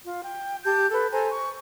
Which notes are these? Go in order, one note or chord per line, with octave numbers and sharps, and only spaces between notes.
F4
G5
G4 A5 G6
A4 B4
A4 C5 G#5 A#5
C#6